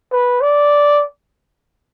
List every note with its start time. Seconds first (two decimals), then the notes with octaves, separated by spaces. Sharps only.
0.12 B4
0.41 D5